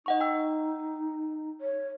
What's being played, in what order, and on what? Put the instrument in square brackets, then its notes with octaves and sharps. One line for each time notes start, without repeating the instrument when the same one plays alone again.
[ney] D#4 [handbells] D#5 F#5 C#6
[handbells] G5 E6
[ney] C#5